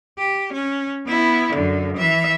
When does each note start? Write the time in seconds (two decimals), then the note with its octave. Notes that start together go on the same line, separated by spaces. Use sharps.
0.19 G4
0.53 C#4
1.07 B3 E4
1.53 F#2 D3
1.97 E3 E5